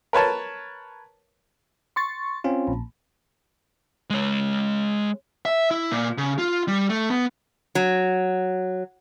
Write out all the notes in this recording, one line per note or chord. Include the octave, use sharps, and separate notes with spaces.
A#4 B4 C#5 A5
C6 C#6 A6
C4 C#4 F4
A#1
G#3 C#5
E5
E4
A#2
C#3
F4
G3
A3
B3
F#3